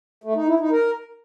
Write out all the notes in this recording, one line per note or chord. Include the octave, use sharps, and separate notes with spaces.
A3
D#4
E4
D#4
A#4